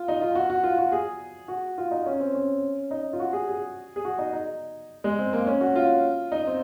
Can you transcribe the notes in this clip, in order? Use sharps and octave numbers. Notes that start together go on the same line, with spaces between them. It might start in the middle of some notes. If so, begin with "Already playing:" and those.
Already playing: F4
D#4
F4
F#4
F#4
F4
F#4
G#4
F#4
F4
D#4
C#4
C4
C#4
D#4
F4
F#4
G#4
G#4
G#4
F#4
D#4
D#4
G#3
C4
A#3
C#4
F#4
F4
D#4
C4